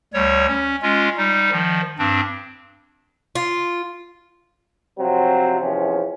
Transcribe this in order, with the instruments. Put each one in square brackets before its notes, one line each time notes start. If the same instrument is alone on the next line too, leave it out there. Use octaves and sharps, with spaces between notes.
[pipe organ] D2 G3 C#5
C#4
G#3 C#4 F4
G3 D#4
D#3 F3
G2 C4 D4
[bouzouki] F4
[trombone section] C3 F3 F#3 C4
E2 C3 F3 C#4